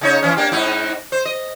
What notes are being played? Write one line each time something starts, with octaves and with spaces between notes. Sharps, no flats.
C#3 D#4 C#5
E3 C#4
A#3 D4 G4
G#2 D#4 E4
C5
D#5